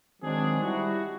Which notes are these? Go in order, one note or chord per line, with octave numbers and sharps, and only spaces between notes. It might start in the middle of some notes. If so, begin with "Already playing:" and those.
D#3 F#3 G#3 C4 D4 G#4
G3 E4 F#4